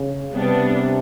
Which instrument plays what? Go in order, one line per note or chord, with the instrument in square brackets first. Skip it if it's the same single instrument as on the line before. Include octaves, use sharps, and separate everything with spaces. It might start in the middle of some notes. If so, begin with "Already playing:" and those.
Already playing: [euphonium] C#3
[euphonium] C3 [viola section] G3 B3 D4